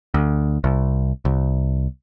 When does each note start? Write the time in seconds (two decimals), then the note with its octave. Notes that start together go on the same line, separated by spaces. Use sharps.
0.14 D2
0.64 C2
1.25 C2